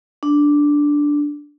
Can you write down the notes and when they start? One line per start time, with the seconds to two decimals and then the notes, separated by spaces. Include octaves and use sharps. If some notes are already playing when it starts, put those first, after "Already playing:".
0.23 D4